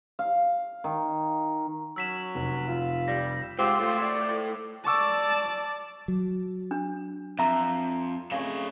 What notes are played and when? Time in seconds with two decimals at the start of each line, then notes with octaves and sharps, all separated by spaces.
0.19 F5
0.84 D#3
1.96 F#3 C#4 E6 B6 E7
2.35 F1
2.68 F4
3.08 G3 A#6
3.59 G#2 C4 F4 G4
3.79 A2 A3 F4
4.02 D5
4.87 D5 A5 C#6 D6 E6
6.08 F#3
6.71 D4
7.39 F2 E5 A#5
8.31 C#3 A3 D#5 C#6